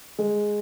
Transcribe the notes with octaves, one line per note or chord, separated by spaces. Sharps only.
G#3